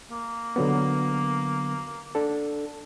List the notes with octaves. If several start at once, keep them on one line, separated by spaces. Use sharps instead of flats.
A#3
D3 F#3 B3
D4 A4